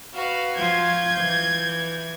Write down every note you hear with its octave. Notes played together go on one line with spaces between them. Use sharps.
F#4 B4 F5
F3 F4 G6 G#6
E3